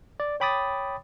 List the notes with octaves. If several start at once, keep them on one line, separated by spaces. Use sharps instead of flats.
D5
C#5 G5 B5 D6 D#6 A6